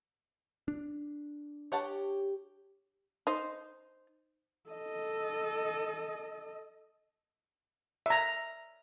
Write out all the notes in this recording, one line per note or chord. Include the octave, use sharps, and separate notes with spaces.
D4
G4 C#5 F#5 A5
D#4 C5
A4 D#5
E5 A#5